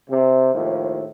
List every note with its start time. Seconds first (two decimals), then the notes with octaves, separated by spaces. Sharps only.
0.10 C3
0.55 D#2 A2 F3